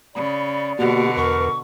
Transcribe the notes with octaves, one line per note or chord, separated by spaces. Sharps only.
C#3 D5 B5
B2 D3 A#3 F#4 G4
E2 A#4 B4 C#6